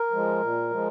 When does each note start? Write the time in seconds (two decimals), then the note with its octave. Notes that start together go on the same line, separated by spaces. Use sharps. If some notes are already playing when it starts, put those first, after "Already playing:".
Already playing: A#4
0.11 F3 G#3
0.41 A#2
0.71 F3 G#3